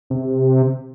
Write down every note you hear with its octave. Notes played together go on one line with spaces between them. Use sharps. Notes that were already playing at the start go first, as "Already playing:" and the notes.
C3